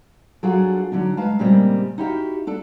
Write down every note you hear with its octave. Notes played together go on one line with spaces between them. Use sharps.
F#3 D4 F4 F#4 G#4 A4
D3 F#3 D4 D#4
G#3 B4 F5 A5 A#5
A#2 C#3 G3 G#3 A#3 C4
D#4 E4 F#4 G4 D5 F5
D4 A4